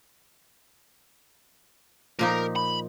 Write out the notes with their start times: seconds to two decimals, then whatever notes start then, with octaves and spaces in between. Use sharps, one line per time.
2.19 A#2 F3 D#4 A#4
2.56 B5